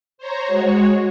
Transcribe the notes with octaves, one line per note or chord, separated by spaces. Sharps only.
C5 C#5 A#5
G#3 F#4 C#5